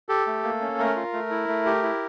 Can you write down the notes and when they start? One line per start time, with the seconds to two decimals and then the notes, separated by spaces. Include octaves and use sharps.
0.09 G4 A4
0.27 A3
0.44 A#3
0.61 C#4
0.79 A3 A#4
0.96 F4
1.13 A3
1.31 E4
1.48 A3
1.66 G4
1.83 E4